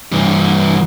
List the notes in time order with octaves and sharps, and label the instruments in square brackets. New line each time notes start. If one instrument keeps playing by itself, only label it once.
[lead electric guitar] G2 E3